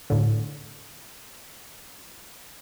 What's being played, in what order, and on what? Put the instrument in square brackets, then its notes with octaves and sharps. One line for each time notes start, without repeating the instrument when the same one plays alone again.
[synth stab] A2 D3